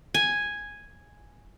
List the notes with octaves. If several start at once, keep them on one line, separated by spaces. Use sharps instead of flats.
G#5